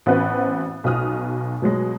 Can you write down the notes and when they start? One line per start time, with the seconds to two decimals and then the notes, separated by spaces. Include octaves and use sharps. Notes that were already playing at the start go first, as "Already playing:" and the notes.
0.06 A1 B3 C4 F#4 B4
0.84 B1 B2 D#6 F6
1.62 B2 F#3 G#3